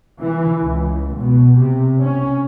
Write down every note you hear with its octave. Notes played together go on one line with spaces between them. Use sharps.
E3
C#2
B2
C3
C#4